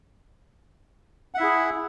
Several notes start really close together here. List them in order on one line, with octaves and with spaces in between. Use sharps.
F#5 E5 E4 G#4